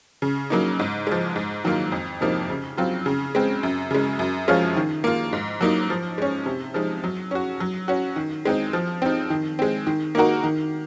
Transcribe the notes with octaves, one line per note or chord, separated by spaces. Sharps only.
C#3
F#3 A#3 D#4
G#2
F3 G#3
G#2
D#3 F#3 A#3 F4
F2
C3 F3 A#3 D#4
C#3
F#3 C4 F4
C#3
G#3 C4
F#2
C#3 G#3
F#2
F3 G#3 C#4 F4
D#3
A#3 F4
G#2
F#3 A#3 D#4
F3
G#3 C#4
C3
F3 G#3 D#4
F#3
C#4 F#4
F#3
C#4 F#4
D#3
G#3 C4 D#4
F3
C4 D#4
D#3
G#3 C4
D#3
A#3 D#4 F#4 A#4
D#3